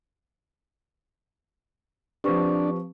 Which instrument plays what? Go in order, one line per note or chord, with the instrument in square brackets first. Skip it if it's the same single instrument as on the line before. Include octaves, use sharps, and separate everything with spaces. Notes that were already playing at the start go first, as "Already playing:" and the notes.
[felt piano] F3 C4 [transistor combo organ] D4 [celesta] G4 B4 C#6